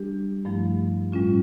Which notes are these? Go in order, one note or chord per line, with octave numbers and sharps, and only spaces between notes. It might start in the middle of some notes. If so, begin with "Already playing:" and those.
Already playing: G3 D4 G4
G2 F3 A3 E4
A2 G3 C#4 F4